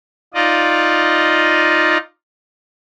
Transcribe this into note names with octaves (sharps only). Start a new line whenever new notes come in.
D#4 F4 D5 D#5